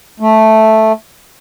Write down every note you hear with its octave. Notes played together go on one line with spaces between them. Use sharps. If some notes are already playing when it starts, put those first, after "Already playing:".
A3